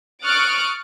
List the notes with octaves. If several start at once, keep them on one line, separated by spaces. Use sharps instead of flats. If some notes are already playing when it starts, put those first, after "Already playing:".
C#6 D#6 F6 F#6 A6 D7